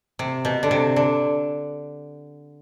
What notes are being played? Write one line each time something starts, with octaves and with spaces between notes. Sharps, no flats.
C3
B2
D3
C3
D3